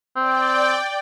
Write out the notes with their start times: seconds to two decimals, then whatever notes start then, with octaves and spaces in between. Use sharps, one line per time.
0.17 C4 D5 G5